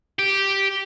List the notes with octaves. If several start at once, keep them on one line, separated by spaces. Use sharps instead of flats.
G4